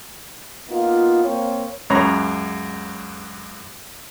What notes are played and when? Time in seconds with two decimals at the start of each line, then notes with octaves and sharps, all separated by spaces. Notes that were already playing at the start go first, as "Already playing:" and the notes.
0.70 A#3 B3 D#4 F4
1.24 A#3 C4 C#5
1.90 C#2 F#2 C#5 A#5 B5